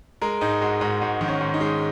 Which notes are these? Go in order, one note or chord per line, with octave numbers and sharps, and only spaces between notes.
G#3 A#4
G#2 D#4
G#3 F#4
G#2 F#4
G#2 F#4
D#3
C#4
G#2
D#4
G#3